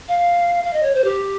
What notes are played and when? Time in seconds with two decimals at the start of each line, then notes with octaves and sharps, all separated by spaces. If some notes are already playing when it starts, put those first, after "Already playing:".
0.08 F5
0.64 F5
0.73 D#5
0.83 C#5
0.95 C5
1.04 G4